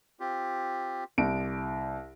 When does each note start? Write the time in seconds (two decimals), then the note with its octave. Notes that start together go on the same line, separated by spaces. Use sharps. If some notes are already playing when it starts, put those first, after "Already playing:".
0.20 C4 F4 G4
1.18 C2 D3 D7